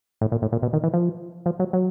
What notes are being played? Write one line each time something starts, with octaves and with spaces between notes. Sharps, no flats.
A2
A#2
A2
A#2
B2
D#3
E3
F3
F3
F#3
F#3